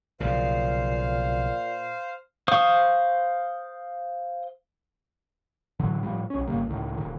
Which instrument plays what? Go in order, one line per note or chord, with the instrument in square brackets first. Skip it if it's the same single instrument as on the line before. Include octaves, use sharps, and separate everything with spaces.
[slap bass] B1 C#3 F3 [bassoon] A#2 [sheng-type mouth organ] C5 F5
[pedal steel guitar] C5 F5 C#6 D#6
[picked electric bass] A2 D3 E3 F#3
A2 F3 G3
B1 C#4
G1 C#3 G3 A#3
C#2 A2 D#3
D#1 D#2 C3 D#3